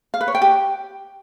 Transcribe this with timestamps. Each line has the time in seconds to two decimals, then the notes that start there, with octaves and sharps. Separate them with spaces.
0.14 F5
0.21 B4
0.28 C#5
0.35 G5
0.42 G4